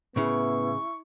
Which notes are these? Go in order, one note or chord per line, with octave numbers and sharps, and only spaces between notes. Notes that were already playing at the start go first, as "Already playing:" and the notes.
A2 C#3 B3 E4 C#6